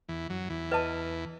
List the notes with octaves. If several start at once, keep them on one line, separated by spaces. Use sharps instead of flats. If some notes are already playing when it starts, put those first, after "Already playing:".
E2 E3
F#2 F#3
E2 E3
B4 D#5 A5